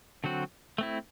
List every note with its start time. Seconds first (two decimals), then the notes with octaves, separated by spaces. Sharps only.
0.24 D3 F#3 C4 F#4
0.78 A3 C4 E4